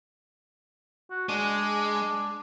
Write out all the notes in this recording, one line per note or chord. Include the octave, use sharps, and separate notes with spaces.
F#4
G#3 D4